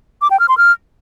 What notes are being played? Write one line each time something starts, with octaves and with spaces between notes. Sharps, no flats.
D6
G5
F6
C6
F6